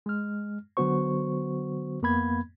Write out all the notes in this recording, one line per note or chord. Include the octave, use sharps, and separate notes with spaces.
G#3 F6
D3 F#3 B3 F#4 C5 C#6
F2 A#3 B3 B5 G#6